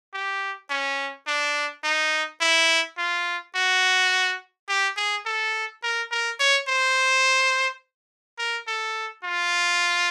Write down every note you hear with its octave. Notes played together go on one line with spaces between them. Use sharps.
G4
C#4
D4
D#4
E4
F4
F#4
G4
G#4
A4
A#4
A#4
C#5
C5
A#4
A4
F4